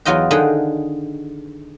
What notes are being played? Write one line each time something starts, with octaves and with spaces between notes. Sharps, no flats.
E2 F#3 F4 D#5 G5
D3 D#3 G#4 F#5 G5